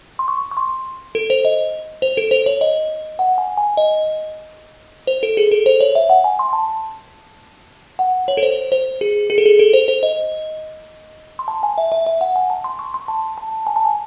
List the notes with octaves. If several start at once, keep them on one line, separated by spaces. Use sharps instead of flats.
C6
C#6
C#6
C6
A4
C5
D#5
C5
A4
C5
C#5
D#5
F#5
G#5
G#5
D#5
C5
A4
G#4
A4
C5
C#5
E5
F#5
G#5
C6
A5
F#5
C#5
A4
C5
C5
G#4
G#4
A4
G#4
A4
C5
C5
D#5
C6
A5
G#5
E5
E5
E5
F#5
G#5
A5
C6
C#6
C6
A5
A5
G#5
A5
G#5